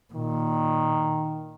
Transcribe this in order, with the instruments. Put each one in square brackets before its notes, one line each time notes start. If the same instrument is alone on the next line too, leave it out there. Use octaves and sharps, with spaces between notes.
[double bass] A#2 [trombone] D#3